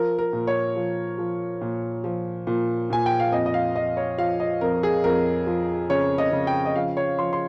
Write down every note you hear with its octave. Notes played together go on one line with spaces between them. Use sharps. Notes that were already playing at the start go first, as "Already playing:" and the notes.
Already playing: F3 A#4
A#4
A#2
C#5
F3
F3
A#2
F3
A#2
A#2 G#5
G5
F5
F2 D#5
D#5
F5
F2 D#5
C#5
F3 F5
D#5
F2 A#4
G#4
F2 A#4
F3
C#3 C#5
D#5
C#3
G5
D#5
F3 F5
C#5
F3 C6
C6